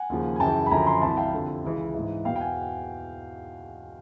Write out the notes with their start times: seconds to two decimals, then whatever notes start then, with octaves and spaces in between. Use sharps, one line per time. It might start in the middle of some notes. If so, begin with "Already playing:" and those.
Already playing: F#5 G#5
0.09 D#2 C#3 F3
0.36 G#5
0.40 F#2 C#3 E3 G5 A5
0.66 B5
0.71 F#2 D3 F3 G#5 A#5
0.80 B5
0.86 A#5 C6
1.02 C2 C3 E3 A5 B5
1.17 F5 G5
1.33 F2 D3 F3
1.64 C#2 C#3 E3
1.94 G#2 E3
2.25 E2 B2 F5 G5
2.36 G5
2.41 F#5 G#5